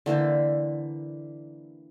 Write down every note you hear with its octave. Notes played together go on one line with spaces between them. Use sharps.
D3 E3 A#3 C5